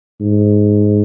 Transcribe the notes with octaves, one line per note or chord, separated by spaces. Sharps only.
G#2